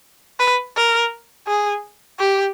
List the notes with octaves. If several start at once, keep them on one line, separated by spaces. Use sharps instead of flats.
B4
A#4
G#4
G4